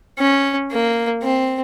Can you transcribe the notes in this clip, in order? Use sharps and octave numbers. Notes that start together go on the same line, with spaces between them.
C#4
A#3
C4